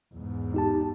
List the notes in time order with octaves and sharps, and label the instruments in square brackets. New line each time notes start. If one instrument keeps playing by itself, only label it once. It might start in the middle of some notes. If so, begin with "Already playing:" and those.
[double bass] E2 G#2
[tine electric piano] D#4 G4 A5